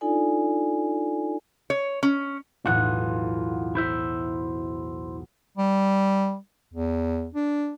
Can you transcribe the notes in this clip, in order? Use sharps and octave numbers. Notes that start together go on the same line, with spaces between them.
D4 D#4 F4 A4 D5 G#5
C#5
C#4
B1 E2 A2 F4 F#5
E4 C5 E5
G3
E2
D4